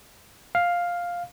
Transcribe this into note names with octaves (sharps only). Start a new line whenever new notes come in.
F5